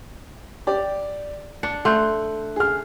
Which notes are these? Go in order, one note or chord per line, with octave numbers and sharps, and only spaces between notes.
G4 D5
D4 C#7
A3 C6 F#6 G6
G#4 F6